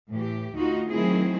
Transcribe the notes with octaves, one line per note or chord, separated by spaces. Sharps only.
A2 E3 G4
D2 D#4 F4 F#4
D#3 F#3 A3 C4 E4 G#4